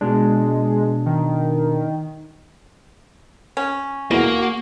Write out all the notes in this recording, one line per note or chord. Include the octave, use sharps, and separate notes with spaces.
B2 G#3 D4
D#3
C#4
E2 A#3 F#4